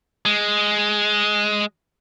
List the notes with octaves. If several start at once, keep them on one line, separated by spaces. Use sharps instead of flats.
G#3